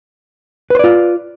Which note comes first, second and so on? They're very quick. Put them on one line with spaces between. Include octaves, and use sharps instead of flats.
B4 C5 D5 F4